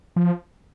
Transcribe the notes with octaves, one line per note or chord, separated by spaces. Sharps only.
F3